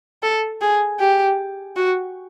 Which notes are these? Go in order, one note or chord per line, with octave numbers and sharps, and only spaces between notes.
A4
G#4
G4
F#4